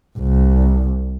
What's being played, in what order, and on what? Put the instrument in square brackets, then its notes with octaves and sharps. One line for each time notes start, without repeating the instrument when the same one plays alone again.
[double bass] C2